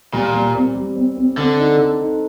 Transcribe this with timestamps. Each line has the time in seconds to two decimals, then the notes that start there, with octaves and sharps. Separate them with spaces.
0.13 A#2 G3
0.34 G3
0.54 C4
0.75 G3
0.96 C4
1.17 C4
1.37 D3 C4
1.59 D#4
1.79 A4
2.01 D#4